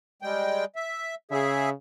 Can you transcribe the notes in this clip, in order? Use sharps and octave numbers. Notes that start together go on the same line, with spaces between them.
G3 G#3 G5
E5
C#3 G#4 E5